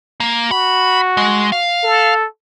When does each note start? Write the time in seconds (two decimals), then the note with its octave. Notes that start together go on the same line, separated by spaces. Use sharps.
0.20 A#3
0.51 F#4 B5
1.17 G#3
1.52 F5
1.84 A4